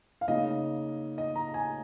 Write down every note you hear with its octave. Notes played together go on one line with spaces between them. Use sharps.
F5
C#3 A#3 D#4 D#5
D#5
A#5
G#5